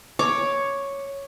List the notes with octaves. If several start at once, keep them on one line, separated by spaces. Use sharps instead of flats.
C#5 D6